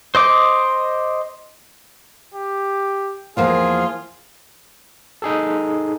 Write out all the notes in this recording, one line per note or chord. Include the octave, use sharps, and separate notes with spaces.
C5 D#5 D6
G4
E2 F3 A#3 F4 G#4
D#4 G#4 A4